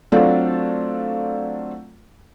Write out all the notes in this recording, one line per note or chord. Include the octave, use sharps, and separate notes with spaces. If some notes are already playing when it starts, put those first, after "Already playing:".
F#3 A3 C4 D4 F4